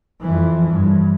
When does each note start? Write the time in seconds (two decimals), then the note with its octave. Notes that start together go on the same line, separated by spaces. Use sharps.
0.21 F2 E3
0.70 G2